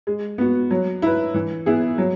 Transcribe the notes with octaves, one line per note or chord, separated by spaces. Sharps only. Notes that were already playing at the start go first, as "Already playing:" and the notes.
G#3
B3 F#4
F#3
E4 B4
E3
B3 E4 G#4
F#3